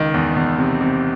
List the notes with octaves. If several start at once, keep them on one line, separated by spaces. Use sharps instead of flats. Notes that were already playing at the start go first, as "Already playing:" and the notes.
Already playing: C#2 D#3
E2
E2
C3
C3